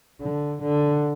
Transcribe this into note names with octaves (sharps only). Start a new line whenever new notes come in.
D3
D3